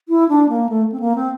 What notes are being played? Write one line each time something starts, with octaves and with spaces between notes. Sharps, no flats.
E4
D4
A#3
A3
C4
A#3
C4